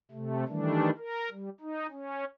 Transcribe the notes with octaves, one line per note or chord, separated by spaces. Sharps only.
C3 A3
D#3 E3 G3 A3 D4
A#4
G3
D#4
C#4